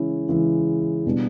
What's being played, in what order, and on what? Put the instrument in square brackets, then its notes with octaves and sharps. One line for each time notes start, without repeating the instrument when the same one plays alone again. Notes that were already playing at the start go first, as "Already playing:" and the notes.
Already playing: [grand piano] C#3 E3 G#3 C#4 E4
C#3 E3 G#3 C#4 E4
B2 G3 B3 D4